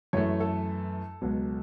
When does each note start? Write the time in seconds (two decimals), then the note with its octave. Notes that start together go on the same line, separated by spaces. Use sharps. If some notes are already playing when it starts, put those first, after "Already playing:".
0.13 F#2 E3 A3 C#5
0.40 A4
1.22 C#2 B2 F#3